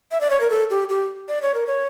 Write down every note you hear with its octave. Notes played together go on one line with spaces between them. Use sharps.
E5
D5
C#5
A#4
A4
G4
G4
D5
C#5
A#4
C#5